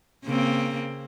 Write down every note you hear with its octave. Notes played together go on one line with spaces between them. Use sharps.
C#3 A#3 C4